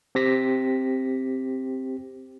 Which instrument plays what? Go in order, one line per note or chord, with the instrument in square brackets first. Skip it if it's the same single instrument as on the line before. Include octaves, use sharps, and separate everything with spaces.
[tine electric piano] C4 G4 A#6 B6